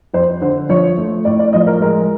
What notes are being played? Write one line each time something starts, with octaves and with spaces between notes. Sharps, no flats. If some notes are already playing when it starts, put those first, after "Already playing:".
F2 C5
D3 C5
F3 C#5
A3
A2 D5
D5
F3 D#5
A#4
G#3 A#4